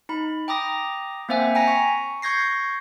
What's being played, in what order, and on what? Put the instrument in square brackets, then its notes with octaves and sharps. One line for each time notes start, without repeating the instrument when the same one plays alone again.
[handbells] D#4 B5
G5 A#5 D6 D#6 A#6
A#3 C4 C5 E5 F#5 G#5
G5 G#5 A#5 A#6 B6
C#6
C#6 G6 G#6 A#6 C7